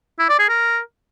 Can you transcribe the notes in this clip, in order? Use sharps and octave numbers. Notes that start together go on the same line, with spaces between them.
E4
D5
G#4
A#4